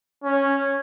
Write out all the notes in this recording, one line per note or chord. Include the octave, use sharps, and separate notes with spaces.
C#4